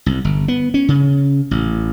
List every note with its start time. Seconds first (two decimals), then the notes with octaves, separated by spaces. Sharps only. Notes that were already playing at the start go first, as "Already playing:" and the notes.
0.06 C2
0.25 G1
0.48 B3
0.74 C#4
0.88 C#3
1.51 A1